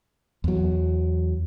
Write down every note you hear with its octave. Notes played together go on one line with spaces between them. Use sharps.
E2 F#3